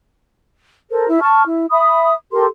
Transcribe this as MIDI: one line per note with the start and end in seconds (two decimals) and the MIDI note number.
0.90 1.08 69
0.90 1.08 70
0.90 1.08 72
1.08 1.20 64
1.21 1.43 81
1.21 1.43 85
1.21 1.43 89
1.46 1.66 64
1.70 2.13 76
1.70 2.13 83
1.70 2.13 87
2.32 2.45 67
2.32 2.45 69
2.32 2.45 70
2.32 2.45 84